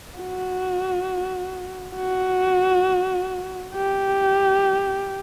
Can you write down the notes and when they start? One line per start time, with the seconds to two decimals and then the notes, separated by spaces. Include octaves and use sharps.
0.18 F#4
1.96 F#4
3.74 G4